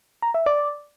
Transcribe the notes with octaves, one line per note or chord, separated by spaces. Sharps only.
A#5
E5
D5